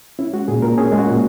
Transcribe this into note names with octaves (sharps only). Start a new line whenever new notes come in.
C#4 E4
G#3 F#4
A#2 G#4
A#2 A#4
C#4 G#4
G#3
F#4
A#2